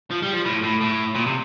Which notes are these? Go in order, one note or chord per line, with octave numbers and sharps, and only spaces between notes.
F3
G3
F3
A2
A2
A2
A#2
C3